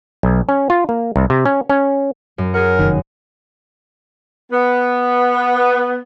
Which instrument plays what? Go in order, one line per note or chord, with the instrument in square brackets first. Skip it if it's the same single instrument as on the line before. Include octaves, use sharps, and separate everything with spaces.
[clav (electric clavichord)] B1
C#4
F4
A#3
C2
C3
C#4
C#4
[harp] F#2
[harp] G#4 F#5 [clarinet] A#4
[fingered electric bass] F1 A#1 D#3
[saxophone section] B3